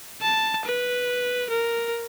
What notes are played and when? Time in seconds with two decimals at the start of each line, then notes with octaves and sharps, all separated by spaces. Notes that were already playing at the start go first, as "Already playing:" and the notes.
0.22 A5
0.65 B4
1.50 A#4